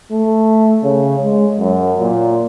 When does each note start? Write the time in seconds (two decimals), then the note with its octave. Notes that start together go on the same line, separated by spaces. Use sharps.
0.12 A3
0.83 C#3
1.22 G#3
1.59 F#2
2.00 A#2